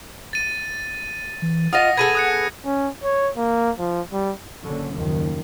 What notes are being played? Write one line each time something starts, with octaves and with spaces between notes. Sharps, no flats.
A6 D#7
E3
F4 D#5 F5 F#5 D#6 A#6
B3 G#4 A4 G#6 D#7
D#6 F#6 C#7
C#4
C#5
A#3
F3
G3
F#1 D3 C#4
F#1 D#2 D#3 F3